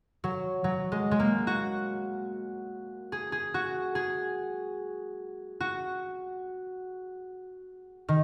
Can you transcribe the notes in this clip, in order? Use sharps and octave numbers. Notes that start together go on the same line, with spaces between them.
F#3
F#3
G#3
G#3
A#3
F#4
G#4
G#4
F#4
G#4
F#4
D#3